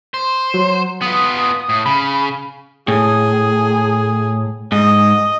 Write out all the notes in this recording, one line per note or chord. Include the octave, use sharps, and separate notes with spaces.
C5
F#3
B3 F4 D#6
A2
C#3 B5
A2 G#4
G#2 D#5